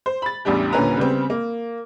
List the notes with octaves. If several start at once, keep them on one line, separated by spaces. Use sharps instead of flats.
C5
B5 A6
A1 E2 G3 D4 G4
D#1 A#2 D3 C#4 B4 A#5
C#3 G3 B3 C4
A#3